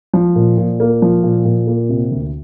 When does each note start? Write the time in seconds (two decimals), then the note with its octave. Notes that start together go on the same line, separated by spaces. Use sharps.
0.13 F3
0.35 A#2
0.57 A#2
0.80 A#3
1.02 F3
1.24 A#2
1.45 A#2
1.67 A#3
1.89 C3
2.11 D2